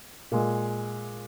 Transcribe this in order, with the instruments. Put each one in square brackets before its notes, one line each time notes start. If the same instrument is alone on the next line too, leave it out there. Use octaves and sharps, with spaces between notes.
[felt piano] A#2 G#3